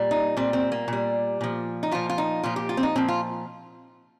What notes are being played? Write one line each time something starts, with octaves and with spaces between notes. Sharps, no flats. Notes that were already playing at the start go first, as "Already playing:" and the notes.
Already playing: A#2 G3
D#4
A#2 G3 C4
C4
A#3
A#2 G3
A#2 F3
D#4
A#2 F3 F4
F4
D#4
A#2 F3 F4
G4
F4
C4
D#4
A#2 F3 C4
F4